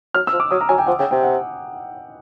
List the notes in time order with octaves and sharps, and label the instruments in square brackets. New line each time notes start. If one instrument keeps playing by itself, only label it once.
[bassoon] F#3 [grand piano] F6
[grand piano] E6
[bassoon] F3
[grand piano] D6
[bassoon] F#3 [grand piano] D#6
[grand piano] A#5
[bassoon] F#3 [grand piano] G#5
[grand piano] G5
[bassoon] F3 [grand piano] F#5
[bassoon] C#3 [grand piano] G5
[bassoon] C3 [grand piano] G5
[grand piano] F#5